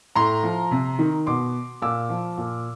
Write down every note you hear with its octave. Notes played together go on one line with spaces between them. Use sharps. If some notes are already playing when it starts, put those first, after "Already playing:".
A2 A#5 C6
F3
C3
D#3
B2 C6 D6
A#2 D6 E6
F3
A#2